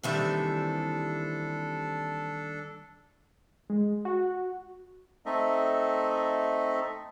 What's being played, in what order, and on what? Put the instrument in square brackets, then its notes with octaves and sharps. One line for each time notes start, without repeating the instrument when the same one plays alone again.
[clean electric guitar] D#2 D#3 G3 [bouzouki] C3 E3 E5 [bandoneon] D4 A4
[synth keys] G#3
F#4
[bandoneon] A3 C4 D#4 A4 D#5 E5